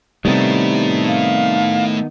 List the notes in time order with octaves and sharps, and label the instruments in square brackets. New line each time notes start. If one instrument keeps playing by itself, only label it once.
[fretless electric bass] C3 G3 [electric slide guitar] D#3 B3 D#4 [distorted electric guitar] A3 E4
[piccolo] F5